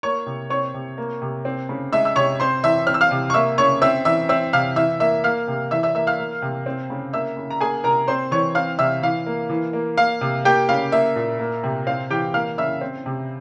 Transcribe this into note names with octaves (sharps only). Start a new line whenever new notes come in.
A#3 C#5 C#6
C3
C4 C#5 C#6
C3
A#3
C3
C4
C#3
G#3 E5 E6
E6
C3 C#5 C#6
C4 C5 C6
E3 E5 E6
C4 F6
E6
F5 F6
C3
C#6
A#3 E5 E6
C#3 C#5 C#6
C4 E5 E6
E3 E5 E6
C4 E5 E6
C3 F5 F6
E3 E5 E6
A#3 E5 E6
A#3 F5 F6
C3
E3 E5 E6
E5 E6
A#3 E5 E6
F5 F6
A#3
C3
C4
C#3
A#3 E5 E6
C#3
A#5
A#3 G#4 G#5
C3 A#4 A#5
C4 C5 C6
E3 C#5 C#6
C4 F5 F6
C3 E5 E6
E3 F5
A#3
E3
A#3
A#3 F5
C3
A#3 G4 G5
C#3 F5
A#3 E5
A#2
A#3
C3
C4 F5
E3 G4 G5
A#3 F5 F6
C#3 E5 E6
C4
C3